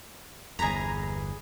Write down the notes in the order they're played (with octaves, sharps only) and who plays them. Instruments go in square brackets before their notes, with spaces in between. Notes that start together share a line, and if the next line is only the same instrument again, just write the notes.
[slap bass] G1 E2 [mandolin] G#4 B5 [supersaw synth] A#5